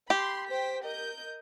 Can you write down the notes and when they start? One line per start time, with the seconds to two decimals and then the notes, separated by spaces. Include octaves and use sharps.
0.10 G4 B5 C6
0.49 C5 G5 B6
0.84 A#4 D#5 G6